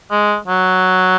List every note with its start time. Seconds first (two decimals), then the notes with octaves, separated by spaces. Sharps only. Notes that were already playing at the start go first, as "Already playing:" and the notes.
0.11 G#3
0.48 F#3